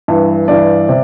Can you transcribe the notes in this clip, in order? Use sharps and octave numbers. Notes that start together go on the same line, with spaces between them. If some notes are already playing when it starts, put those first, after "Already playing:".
G2 E3
G2 E3 D5
C3